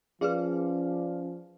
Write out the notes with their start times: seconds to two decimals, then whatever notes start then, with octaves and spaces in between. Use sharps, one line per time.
0.21 F3 C#4 F4 G#4 B4 D5 F5